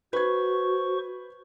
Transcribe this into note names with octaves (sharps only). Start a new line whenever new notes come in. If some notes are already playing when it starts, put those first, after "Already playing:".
F#4 B4 C5 C#6 G#6